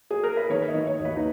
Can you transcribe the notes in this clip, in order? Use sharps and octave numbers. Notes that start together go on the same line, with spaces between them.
G#4
A#4
B4
D#3 C#5
D#5
D#3
C#5
D#2
B4
D#4